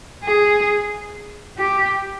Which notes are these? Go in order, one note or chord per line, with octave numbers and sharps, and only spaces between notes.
G#4
G4